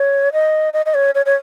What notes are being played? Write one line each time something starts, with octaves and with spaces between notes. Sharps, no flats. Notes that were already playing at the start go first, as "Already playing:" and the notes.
Already playing: C#5
D#5
D#5
D#5
C#5
C#5
C#5